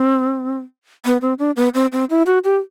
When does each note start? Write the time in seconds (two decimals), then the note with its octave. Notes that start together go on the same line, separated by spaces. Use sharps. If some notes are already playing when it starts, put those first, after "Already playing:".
Already playing: C4
1.05 B3
1.21 C4
1.39 D4
1.56 B3
1.74 C4
1.92 C4
2.10 E4
2.26 F#4
2.44 G4